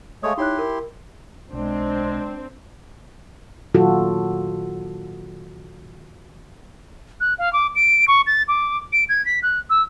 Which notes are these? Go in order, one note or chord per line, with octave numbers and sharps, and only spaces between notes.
G#3 A3 C#5 F5 D#6
D#4 E4 G4 C#5 C6 F#6
A#4
B1 G#3 C4 D4
A#2 D#3 F#3 F4 F#4 A4
F#6
F5
D6
D7
C#6
A6
D6
D7
G#6
B6
F#6
E6